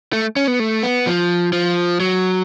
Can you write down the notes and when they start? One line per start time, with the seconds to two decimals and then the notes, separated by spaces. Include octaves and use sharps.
0.13 A3
0.36 C#4
0.48 B3
0.60 A3
0.83 B3
1.07 F3
1.53 F3
2.00 F#3